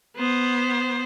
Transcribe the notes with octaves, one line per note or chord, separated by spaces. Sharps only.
B3 C5